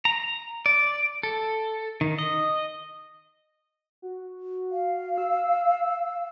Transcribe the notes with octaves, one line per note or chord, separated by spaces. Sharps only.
A#5
D5
A4
D#3
D#5
F#4
F5
E6